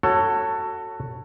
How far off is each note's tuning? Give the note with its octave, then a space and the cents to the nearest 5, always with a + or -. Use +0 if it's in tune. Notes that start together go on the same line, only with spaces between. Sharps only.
F#4 +5 A4 +20 C#5 -5